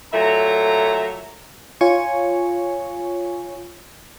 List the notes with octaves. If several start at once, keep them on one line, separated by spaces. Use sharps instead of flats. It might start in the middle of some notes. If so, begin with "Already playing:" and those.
A#2 F#3 A3 E5 A#5
F4 C#5 G#5 C#6